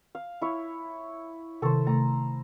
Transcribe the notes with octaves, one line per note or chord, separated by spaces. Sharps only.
F5
E4 C#5
C3 D#3 A4 C5 C#6
C3 A3 A#5